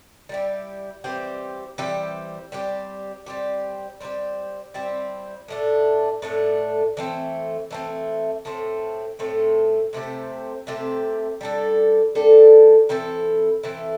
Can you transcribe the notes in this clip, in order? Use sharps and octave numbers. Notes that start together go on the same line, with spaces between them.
G3 E4 G4
E3 G3 C4 G4
E3 G3 C4 G4
G3 C4 G4
G3 C4 G4
G3 C4 E4 G4
G3 C4 E4 G4
A2 A3 D4
A2 A3 D4
E3 A3 C4
E3 A3 C4
A2 A3 C4
A2 A3 C4
C3 A3 C4 G4
C3 A3 C4 G4
G3 D4 A4
G3 D4 A4
E3 C4 E4 A4
E3 C4 E4 A4